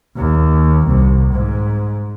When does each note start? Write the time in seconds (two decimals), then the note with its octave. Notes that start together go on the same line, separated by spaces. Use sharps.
0.17 D#2
0.87 C2
1.33 G#2